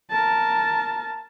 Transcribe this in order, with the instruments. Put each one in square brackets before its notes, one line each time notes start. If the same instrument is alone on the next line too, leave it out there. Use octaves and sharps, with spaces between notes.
[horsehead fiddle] A#4 A5